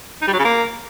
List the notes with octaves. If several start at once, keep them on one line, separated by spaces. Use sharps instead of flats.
D#4
G3
F#3
C#3
A#3